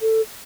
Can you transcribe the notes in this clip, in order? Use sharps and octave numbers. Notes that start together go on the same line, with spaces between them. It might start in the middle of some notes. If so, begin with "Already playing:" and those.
A4